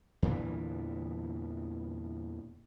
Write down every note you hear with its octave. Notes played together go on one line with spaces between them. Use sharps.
E2 A#2 D3 E3